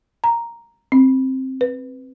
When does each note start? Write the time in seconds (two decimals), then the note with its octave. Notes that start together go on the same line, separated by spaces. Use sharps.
0.24 A#5
0.92 C4
1.61 B4